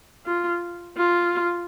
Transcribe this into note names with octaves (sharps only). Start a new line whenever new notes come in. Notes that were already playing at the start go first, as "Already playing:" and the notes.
F4
F4